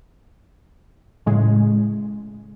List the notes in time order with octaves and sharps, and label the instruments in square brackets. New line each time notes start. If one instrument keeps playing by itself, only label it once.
[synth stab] A2 C#3 G#3